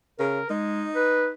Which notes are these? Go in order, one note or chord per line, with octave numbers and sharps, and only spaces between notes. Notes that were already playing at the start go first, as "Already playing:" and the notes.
C#3 A#4
G#3 D#4
B4